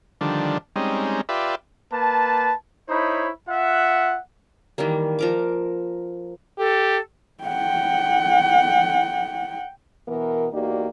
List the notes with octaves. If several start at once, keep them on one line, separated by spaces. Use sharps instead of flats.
D3 D#3 F3 G3 D4
G3 G#3 C4 C#4 D#4
F4 G4 B4 D5 E5
A#3 B4 A5
D#4 E4 C5 C#5 B5
F4 E5 F#5
D#3 E3 G3 A#3
F3 A#4 D6
G4 A4
F#5 G5
B2 E3 B3 A#4
E2 A#3 D#4 F#4 G4 D5